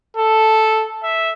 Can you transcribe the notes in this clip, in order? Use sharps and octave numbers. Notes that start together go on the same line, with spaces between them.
A4
E5